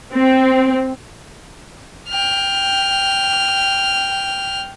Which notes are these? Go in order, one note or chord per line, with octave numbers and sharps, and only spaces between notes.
C4
G5 F6